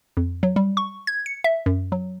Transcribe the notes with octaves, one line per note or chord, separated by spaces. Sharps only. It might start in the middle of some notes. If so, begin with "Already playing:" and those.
F2
F#3
G3
C#6
G#6
C#7
E5
F#2
F#3